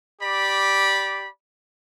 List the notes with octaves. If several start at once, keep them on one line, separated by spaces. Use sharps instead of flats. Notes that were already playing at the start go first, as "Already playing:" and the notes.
G4 D5 B5